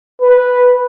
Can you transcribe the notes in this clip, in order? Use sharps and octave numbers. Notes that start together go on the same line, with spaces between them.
B4